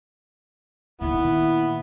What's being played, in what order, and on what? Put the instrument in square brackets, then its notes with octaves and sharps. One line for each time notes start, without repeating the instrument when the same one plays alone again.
[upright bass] A#2 D#3 [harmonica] B3 [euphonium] E4